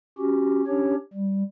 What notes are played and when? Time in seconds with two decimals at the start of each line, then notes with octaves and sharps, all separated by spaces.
0.18 C#4 F#4 G4
0.67 C#4 D4 G4 C#5
1.13 G3